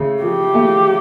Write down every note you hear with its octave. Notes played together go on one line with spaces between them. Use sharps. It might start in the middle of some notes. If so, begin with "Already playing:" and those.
Already playing: C#3 A3
F3 G4
A3